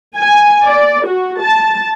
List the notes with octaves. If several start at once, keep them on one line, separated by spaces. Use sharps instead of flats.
G#5
D5
F#4
A5